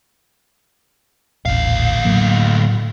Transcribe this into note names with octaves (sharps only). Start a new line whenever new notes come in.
D#1 A1 D2 F5
A2 F#3 A#3